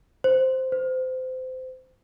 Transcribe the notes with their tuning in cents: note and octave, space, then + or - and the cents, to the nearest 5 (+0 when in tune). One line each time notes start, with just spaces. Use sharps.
C5 -5
C5 -25